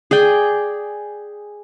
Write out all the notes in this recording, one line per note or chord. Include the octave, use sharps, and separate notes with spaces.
G#4 D5 G5